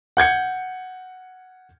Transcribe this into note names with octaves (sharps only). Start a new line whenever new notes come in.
F#5 G6 G#6 C#7